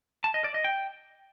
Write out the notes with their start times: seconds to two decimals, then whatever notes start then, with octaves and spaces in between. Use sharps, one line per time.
0.24 A5
0.34 D#5
0.44 D5
0.54 D#5
0.64 G5